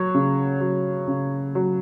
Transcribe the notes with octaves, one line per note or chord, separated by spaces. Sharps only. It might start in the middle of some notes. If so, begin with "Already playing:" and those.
Already playing: F#3 C#5
C#3
F#3
C#3
F#3